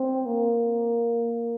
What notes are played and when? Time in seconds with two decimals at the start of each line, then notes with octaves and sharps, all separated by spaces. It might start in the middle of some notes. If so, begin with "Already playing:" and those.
Already playing: C4
0.26 A#3